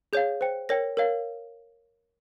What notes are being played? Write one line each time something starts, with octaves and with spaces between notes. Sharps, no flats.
G#4 C#5 F5 G6
C5 G5
A#4 C#5 G5 A#6
A#4 C#5 F5